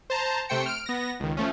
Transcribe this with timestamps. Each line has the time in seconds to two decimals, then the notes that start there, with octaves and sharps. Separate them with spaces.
0.10 C5 A5 A#5
0.49 C3 A3 C5 G5 C#7
0.66 F6 D7
0.86 B3 A#6
1.20 C#2 D#3
1.37 F3 A3 C#4